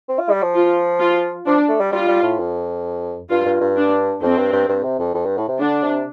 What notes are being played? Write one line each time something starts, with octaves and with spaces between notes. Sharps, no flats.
C4
F4
G3
F3
F4
F4
F3 D4
A3
G3
G3 F4
G3
A2
F2
G2 F4
G2
G2
D4
F2 C4
G2
G2
G2
C3
F2
F2
G2
A2
C3
D3 D4
C3